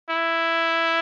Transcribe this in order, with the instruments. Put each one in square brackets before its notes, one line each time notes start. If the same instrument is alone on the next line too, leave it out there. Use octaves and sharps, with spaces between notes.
[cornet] E4